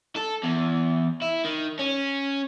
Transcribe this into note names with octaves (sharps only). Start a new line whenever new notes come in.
A4
E2
E4
D#3
C#4